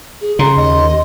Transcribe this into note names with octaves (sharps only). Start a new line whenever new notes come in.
G#4
C#3 A#5 C6
D#2 D#5